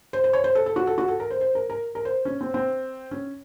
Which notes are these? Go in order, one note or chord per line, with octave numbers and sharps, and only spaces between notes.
C5
C5
C#5
C5
A4
A4
F#4
A4
F#4
A4
A#4
C5
C5
A#4
A#4
A#4
C5
C#4
C4
C4
C#4